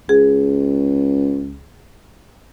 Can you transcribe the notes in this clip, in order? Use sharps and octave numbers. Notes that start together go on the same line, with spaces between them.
C#2 G#4